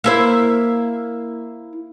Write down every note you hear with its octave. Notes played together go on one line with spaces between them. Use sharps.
A#3 E4 C5